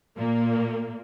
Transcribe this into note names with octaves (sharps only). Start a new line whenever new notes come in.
A#2 A#3